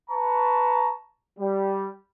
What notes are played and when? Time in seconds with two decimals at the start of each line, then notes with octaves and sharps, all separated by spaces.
0.10 B4 A5 A#5 C#6
1.39 G3